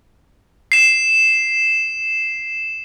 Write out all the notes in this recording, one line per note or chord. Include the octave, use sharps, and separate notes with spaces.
C7 E7